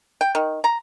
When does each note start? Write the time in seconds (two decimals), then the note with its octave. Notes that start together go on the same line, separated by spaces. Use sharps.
0.21 G5
0.35 D#3
0.64 A#5